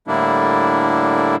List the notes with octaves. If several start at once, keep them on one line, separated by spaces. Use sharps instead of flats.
A2 D3 G3 A#3 D4 E4